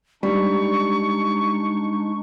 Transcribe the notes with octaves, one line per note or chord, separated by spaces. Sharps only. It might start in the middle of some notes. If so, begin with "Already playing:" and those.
G3 G#3 D4 D#4 C#6